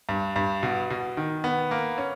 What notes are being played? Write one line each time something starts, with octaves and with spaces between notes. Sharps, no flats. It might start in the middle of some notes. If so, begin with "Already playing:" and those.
G2
G2
B2
B2
D#3
B3
A#3
C#4